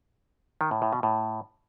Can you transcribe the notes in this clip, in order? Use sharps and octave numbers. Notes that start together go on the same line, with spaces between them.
D#3
A2
A2
B2
A2